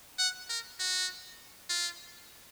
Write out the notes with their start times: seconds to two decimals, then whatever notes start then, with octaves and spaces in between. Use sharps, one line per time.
0.19 F#5
0.49 A#4
0.79 F#4
1.69 F4